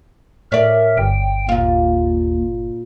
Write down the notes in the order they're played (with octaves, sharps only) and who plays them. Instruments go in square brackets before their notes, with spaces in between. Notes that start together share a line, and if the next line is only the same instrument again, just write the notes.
[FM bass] A2 [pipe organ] A#4 E5 [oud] C#5 D5
[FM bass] G1 [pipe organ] G5
[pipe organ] D#2 [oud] A#2 F4